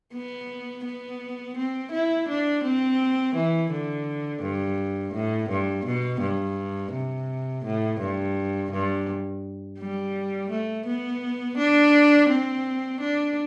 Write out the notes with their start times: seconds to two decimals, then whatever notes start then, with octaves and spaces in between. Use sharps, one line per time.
0.13 B3
0.85 B3
1.57 C4
1.92 E4
2.28 D4
2.64 C4
3.35 E3
3.71 D3
4.42 G2
5.14 A2
5.50 G2
5.86 B2
6.21 G2
6.92 C3
7.64 A2
8.00 G2
8.72 G2
9.79 G3
10.50 A3
10.86 B3
11.57 D4
12.29 C4
13.01 D4